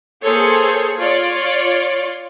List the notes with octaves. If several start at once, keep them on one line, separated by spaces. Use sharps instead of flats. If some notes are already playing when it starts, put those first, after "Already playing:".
A#3 G#4 A4 C5 C#5
F4 C#5 D5